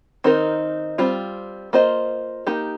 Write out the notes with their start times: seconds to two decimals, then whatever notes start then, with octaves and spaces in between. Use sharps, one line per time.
0.24 D#3 C4 D#4 A#4
0.98 G3 C4 F4
1.73 A#3 F4 C5 D#5
2.47 A#3 D#4 G4